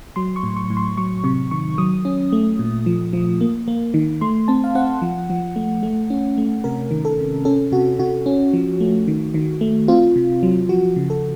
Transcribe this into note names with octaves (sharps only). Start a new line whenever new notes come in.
F#3 C6
C#6
A2
C#6
A2
C6
F#3 C#6
C3 C#6
D#3 C#6
F#3 D#6
C#4
A3
A#2
F3
F3
A#3
A#3
D#3
A3 C6
C4 A5
F5
C4 F#5
F3
F3
A3
A3
C#4
A3
C3 A#4
D#3
A4
C3
C#4 A4
C3 F#4
C3 F#4
C#4
F3
A3
D#3
D#3
A3
C4 F4
C3
F#3
F3 F#4
C#3
A4